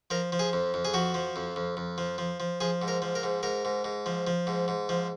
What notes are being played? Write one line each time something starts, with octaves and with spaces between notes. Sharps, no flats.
F3 A#4
F3
G#4
F2
F2
G#4
F3 F#4
F3
F2
F2
F2
F3
F3
F3
F3 G#4
G#2
A#4
F3
A#4
G#2
G#2 A#4
G#2
G#2
F3
F3
G#2
G#2
F3